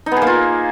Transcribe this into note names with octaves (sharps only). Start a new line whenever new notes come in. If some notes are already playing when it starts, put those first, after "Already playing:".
D#4
B3
G#4
A#3
F4